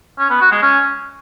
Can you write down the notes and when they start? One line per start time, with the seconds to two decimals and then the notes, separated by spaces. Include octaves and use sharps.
0.19 C#4
0.30 B3
0.41 F#4
0.52 G#3
0.62 C#4